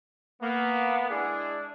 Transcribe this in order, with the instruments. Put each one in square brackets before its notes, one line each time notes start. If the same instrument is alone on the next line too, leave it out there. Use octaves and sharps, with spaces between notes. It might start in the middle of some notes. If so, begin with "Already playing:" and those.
[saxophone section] A#3 [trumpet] B3
[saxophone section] G#3 E4 G#4 [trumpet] D4